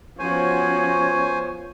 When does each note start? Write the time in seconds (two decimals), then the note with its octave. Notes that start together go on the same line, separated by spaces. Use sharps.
0.19 F3 B3 C#4 F#4 C5 C#5 G#5